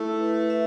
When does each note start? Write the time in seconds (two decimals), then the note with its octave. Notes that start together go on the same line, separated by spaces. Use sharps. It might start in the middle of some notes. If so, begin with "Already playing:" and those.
Already playing: A3 E4
0.20 B4
0.50 E5